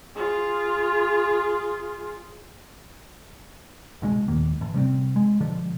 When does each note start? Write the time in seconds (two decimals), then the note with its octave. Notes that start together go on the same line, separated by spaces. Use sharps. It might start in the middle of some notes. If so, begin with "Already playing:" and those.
0.17 F4 G#4
4.02 C2 B2 G#3
4.28 A#1 D#2 D#3 A#3
4.61 A1
4.74 C3 G3 A#3 C4
5.16 G#3
5.41 B2 D3 F3